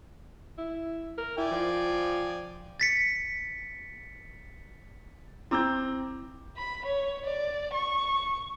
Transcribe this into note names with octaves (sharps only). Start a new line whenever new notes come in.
E4
A#4
E4 D5 G5 G#5
F3
A6 B6 C#7
C4 E4 A#5 D6 E6 G6
B5
C#5
D5
C#6